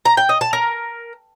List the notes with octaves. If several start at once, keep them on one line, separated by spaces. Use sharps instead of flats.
A#5
G5
D#5
A5
A#4